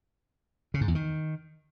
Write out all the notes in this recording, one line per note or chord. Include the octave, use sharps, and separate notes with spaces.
C#3
G#2
E2
D#3